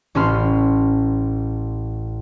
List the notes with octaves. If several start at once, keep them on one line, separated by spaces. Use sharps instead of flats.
A1 C#4 A4 B5 C6 F6